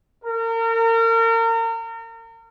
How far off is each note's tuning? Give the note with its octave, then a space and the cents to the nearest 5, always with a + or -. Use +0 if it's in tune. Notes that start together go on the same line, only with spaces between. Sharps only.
A#4 -35